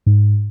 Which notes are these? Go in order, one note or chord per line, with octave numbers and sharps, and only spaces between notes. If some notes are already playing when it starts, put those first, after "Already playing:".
G#2